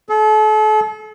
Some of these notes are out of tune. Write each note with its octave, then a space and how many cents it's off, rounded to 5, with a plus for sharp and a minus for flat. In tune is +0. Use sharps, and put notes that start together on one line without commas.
A4 -40